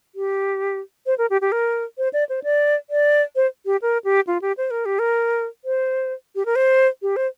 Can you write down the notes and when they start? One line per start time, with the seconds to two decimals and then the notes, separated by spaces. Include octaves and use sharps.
0.15 G4
1.06 C5
1.18 A#4
1.30 G4
1.41 G4
1.52 A#4
1.98 C5
2.13 D5
2.29 C5
2.43 D5
2.90 D5
3.36 C5
3.66 G4
3.82 A#4
4.04 G4
4.27 F4
4.41 G4
4.57 C5
4.70 A#4
4.85 G4
4.99 A#4
5.65 C5
6.35 G4
6.45 A#4
6.55 C5
7.02 G4
7.16 C5